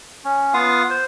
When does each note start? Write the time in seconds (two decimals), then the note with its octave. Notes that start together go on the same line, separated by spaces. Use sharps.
0.24 C#4
0.54 B3 F4 F5 D#6
0.90 C5